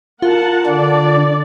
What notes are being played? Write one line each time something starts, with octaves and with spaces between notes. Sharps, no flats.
F4 A#4 F#5 A5
D3 D4 D5